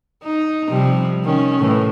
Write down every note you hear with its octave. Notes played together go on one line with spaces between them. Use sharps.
D#4
C3 F3 G3
D#3 C#4
A2 E3